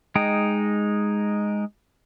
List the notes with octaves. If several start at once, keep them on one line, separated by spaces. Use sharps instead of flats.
G#3 D#4 G5